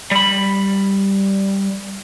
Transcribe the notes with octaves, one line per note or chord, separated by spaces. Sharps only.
G3 B5